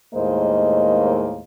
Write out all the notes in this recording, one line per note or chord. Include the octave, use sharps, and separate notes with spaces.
D#2 A2 G#3 A#3 C5 D#5